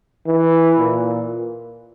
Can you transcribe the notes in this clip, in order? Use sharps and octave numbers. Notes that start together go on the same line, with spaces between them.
E3
A#2